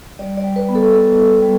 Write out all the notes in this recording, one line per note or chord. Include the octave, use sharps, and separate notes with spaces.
G3 D5
D5
G3
B4
B3
A4
B3 A4
E4
G3